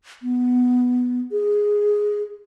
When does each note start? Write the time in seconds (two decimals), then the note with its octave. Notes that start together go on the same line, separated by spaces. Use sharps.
0.22 B3
1.32 G#4